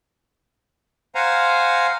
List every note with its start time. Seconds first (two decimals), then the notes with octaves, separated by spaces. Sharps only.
1.15 C5 F5 F#5 G#5 A#5